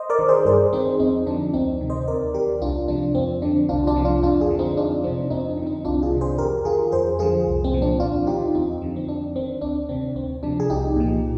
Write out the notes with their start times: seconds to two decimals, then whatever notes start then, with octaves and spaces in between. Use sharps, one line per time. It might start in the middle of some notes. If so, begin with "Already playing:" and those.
Already playing: C5 D#5
0.10 A#4 D5
0.19 D#3
0.28 G#4 C5
0.45 G2 G#4 C5
0.73 D#3 C4 D#4
0.99 F2 C4 D#4
1.26 D3 F3 D4
1.53 D2 C4 D#4
1.80 C3 D#3
1.90 C5 D#5
2.08 D#2 A#4 D5
2.34 D#3 G4 A#4
2.61 C2 D4 F4
2.88 C3 F3 D4
3.15 F2 C4
3.42 D3 F3 D4
3.69 C2 D4 F4
3.87 D4 F4
3.96 C3 F3
4.05 D4 F4
4.23 F2 D4 F4
4.41 F4 G#4
4.50 D3 F3
4.59 C4 D#4
4.77 F2 D4 F4
5.04 C3 F3 C4 D#4
5.30 F2 C4 D#4
5.49 D4
5.57 D3
5.63 F3 C4 D#4
5.85 C2 D4 F4
6.03 F4 G#4
6.12 C3 D#3
6.21 G#4 C5
6.38 F2 G4 A#4
6.65 D#3 F4 G#4
6.92 F2 G#4 C5
7.19 D3 F3 F4 G#4
7.47 C2
7.64 C4
7.73 A#2 F3
7.82 D4
8.00 D#2 D4 F4
8.27 D#3 D#4 G4
8.55 F2 C4 D#4
8.82 D3 F3
8.96 C4
9.08 F2 D4
9.35 D#3 C4
9.61 D2 D4
9.89 C3 D#3 C4
10.15 D2 C4
10.43 C3 F3 D4
10.60 G#4
10.70 C2 D#4 G4
10.96 A#2 F3